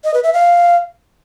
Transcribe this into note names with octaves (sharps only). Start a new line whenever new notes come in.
D#5
B4
E5
F5